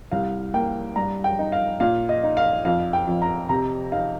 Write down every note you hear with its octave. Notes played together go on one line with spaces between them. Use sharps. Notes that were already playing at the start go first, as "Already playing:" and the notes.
C2 F5
A#3 G5
G2 A#5
G5
D#4
F5
A#2 F5
D#5
D#4
F5
F2 F5
G5
F2
A#5
C3 A#5
D#4 F5